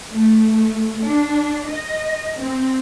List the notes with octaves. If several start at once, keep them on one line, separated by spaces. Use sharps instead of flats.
A3
D4
D#5
C4